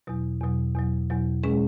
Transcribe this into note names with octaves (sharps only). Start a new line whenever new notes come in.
E2 B2 F#3
E2 B2 F#3
E2 B2 F#3
E2 B2 F#3
B2 G#3 C#4 G#4